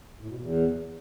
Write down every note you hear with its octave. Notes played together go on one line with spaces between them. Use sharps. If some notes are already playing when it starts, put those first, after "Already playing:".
A2
B2
E2